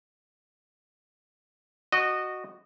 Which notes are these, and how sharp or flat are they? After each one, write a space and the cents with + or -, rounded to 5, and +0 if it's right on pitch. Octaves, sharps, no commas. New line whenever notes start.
F#4 +0 D#5 -20